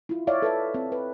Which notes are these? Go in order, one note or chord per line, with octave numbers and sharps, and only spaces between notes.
E4 F4
C#5 D5 E5 F5
A4 B4 E5
C4
B4